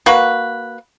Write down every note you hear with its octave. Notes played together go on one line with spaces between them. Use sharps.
A#3 F#4 B4